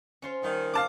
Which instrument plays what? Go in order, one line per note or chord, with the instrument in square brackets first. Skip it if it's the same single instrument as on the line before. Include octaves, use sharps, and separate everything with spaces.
[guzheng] C#4 F4 C5
[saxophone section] D#3 [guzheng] G3 F4
[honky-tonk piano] F5 A5 D6